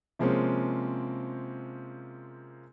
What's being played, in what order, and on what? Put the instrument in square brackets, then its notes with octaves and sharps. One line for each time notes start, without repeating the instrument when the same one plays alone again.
[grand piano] C3 F3 G#3 A#3 C4 C#4